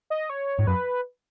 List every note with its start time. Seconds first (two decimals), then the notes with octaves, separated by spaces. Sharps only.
0.10 D#5
0.30 C#5
0.59 G#2
0.67 F#2 B4